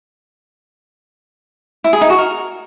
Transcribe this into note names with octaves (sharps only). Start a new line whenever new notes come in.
E4
G#4
D#4
F#4
A#4